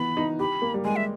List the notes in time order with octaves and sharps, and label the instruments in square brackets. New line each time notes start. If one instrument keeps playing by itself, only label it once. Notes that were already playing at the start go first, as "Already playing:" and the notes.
Already playing: [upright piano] E3 B3 [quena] B5
[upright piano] D#4
[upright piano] G4 [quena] B5
[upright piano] A#3
G3
[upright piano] G#3 [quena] G#5
[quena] E5